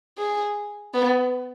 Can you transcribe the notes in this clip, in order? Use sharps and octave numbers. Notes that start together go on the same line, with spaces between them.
G#4
B3